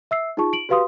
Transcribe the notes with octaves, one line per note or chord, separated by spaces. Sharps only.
E5 E6 C7
D#4 F4 G#4 A5 C#6
D7 F#7
F#4 G4 B4 F5 C6 D#6